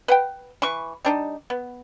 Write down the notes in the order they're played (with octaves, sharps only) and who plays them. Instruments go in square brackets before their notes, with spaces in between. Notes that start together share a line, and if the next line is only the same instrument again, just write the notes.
[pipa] B4 F#5 G5
E3 B4 C#6
G3 D4 D#4
B3